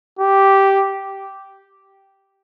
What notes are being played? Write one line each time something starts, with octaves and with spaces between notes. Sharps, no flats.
G4